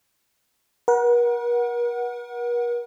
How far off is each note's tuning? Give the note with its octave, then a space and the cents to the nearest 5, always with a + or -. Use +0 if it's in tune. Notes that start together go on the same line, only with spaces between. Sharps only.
A#4 +45 F#5 +0